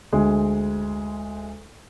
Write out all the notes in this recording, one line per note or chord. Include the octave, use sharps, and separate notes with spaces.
D2 G#3